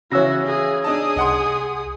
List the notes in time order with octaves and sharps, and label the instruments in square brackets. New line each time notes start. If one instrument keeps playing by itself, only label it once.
[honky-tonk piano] C#3 E3 [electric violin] F#4 [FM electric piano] C#5 E6 A#6
[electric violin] G#4
[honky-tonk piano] D4 D#4 A5 [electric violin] G#4 D#6
[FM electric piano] C2 [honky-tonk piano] D#5 F#5 C6